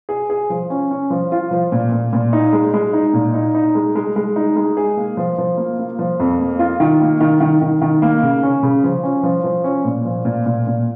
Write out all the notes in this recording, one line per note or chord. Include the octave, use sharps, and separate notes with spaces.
G#4
G#4
F3
C#4
C#4
F3
F4
F3
A#2
A#2
A#2
D#4
G#3
G#3
D#4
A#2
D#4
D#4
G#3
G#3
G#3
D#4
G#3
G#4
A#3
F3
F3
A#3
A#3
F3
F2
A#3
F4
D#3
A#3
D#3
D#3
D#3
D#3
A#3
C#3
C#4
C#3
F3
C#4
F3
F3
C#4
A#2
F3
A#2
A#2
A#2